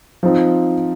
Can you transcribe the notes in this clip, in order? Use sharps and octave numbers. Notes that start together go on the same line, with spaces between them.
F3 C4 D#4